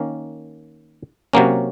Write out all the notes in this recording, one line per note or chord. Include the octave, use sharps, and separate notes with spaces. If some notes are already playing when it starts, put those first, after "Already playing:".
Already playing: D#3 A#3 C#4
C3 F#3 A#3 C#4